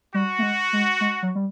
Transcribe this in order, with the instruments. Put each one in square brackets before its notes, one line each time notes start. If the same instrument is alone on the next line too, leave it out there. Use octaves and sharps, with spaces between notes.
[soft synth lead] G3 [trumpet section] F#4
[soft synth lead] A3
G#3
G#3
G#3
F#3
G3